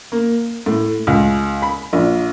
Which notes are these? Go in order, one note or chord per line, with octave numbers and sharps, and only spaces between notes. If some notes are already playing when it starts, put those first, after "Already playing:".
A#3
A2
C#2
B5
A#1